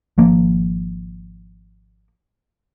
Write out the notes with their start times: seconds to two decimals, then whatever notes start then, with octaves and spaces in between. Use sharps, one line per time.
0.18 G#1 F3 A#3